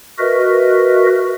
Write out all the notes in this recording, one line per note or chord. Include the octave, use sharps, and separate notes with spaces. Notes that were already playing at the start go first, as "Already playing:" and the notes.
F#4 A#4 B4 D#5 E5